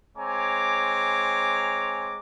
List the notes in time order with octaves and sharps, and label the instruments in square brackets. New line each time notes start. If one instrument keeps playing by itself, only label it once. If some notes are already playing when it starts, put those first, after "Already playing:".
[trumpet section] G#3 C4 C#5 G#5 A#5 D6